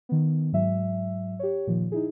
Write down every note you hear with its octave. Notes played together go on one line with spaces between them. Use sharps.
D#3 B3
G#2 F#3 E5
G4 C#5
A#2 D#3 F3
D#4 E4 G#4